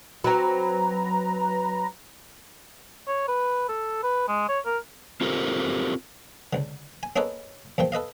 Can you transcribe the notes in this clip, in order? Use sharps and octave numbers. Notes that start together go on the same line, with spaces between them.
F#3 C4 B4 A#5
C#5
B4
A4
B4
G#3
C#5
A#4
C4 F4 G4 A4 A#4 C5
C#2 D3
G#5
A#3 C#4 D#4 G#4 A4 B4
E2 A#2 F3 G5
A4 B4 D#5 F5